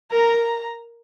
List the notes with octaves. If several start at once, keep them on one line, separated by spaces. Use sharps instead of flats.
A#4 A#5